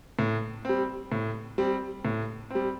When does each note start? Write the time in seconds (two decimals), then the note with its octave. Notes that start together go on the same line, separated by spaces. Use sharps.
0.19 A2
0.65 G3 C4
1.12 A2
1.58 G3 C4
2.05 A2
2.50 G3 C4